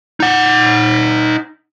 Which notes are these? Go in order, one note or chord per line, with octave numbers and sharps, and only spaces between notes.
D#4 F#5